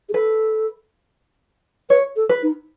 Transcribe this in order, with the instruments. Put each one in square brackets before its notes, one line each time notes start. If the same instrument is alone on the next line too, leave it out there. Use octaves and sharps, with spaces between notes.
[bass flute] G#4
[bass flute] A4 [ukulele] B4
[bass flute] B4 [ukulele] C#5
[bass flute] A4
[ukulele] B4
[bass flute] D#4